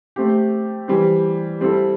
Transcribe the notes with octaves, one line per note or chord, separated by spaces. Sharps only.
A3 C4 G4
E3 G3 C4
G3 C4 E4 A4